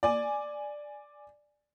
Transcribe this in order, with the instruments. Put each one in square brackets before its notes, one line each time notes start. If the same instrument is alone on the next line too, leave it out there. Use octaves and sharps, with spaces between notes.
[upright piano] D5 G#5